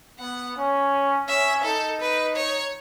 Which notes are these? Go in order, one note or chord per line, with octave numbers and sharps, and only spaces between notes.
B3 F#5
C#4
C#4 E5
D#4 A4
B4
C#5